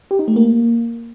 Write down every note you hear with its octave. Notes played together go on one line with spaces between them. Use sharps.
G4
D#4
A3
A#3